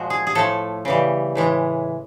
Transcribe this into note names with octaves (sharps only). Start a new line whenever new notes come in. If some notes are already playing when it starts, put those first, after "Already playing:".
Already playing: A#2 F3 G#3 F#4
G#4
G#4
A2 F3 A3 A4
C#3 E3 G3
A2 E3 G#3